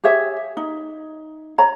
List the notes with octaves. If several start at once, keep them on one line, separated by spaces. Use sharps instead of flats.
G4 G#4 C#5 E5
D#4
C#5 A#5